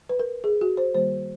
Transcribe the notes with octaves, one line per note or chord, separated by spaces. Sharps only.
B4
A#4
G#4
F#4
C5
D#3 G3 A#3 C5